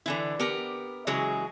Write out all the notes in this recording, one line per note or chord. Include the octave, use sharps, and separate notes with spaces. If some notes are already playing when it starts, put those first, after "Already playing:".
D3 E3 E4
B3 G4 A#4
C#3 E3 F#3 G#3 G#4